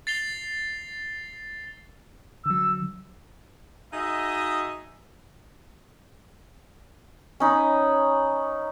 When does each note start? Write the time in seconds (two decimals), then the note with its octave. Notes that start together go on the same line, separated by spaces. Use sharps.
0.07 A6 C7 F7 G7
2.46 D3 F#3 E6
3.92 D#4 F#4 G#4 D#5 E5
7.40 C#4 D#4 B5